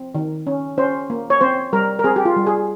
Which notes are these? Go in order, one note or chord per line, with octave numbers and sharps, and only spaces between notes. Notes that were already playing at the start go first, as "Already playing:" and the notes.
Already playing: C4
D#3
C#4
C#4 C5
A#3
C#5
C4 C5
G3 A#4
A#4
C4 G#4
G4
F4
G3
G#4